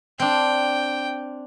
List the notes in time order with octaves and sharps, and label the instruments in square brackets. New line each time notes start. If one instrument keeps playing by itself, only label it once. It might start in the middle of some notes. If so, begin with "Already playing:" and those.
[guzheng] C4 D4 [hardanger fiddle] G5